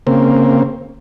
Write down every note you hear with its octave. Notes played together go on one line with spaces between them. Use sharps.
C#3 A#3 C4